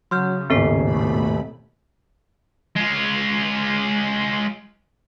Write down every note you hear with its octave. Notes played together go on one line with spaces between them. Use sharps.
C#3 F#3 C6 F6 G6
D#1 G#1 A2 B3 A4 C7
B2 A3 B5
G#3 F4